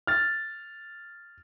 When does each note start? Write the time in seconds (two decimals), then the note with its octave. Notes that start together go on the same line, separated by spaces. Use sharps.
0.07 F6 A6